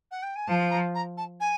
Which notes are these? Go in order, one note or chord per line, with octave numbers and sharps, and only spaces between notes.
F#5
G5
G#5
F3 A5
A#5
A#5
A5
G#5